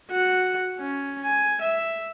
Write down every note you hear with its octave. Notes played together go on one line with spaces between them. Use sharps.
F#4 F#5
C#4
G#5
E5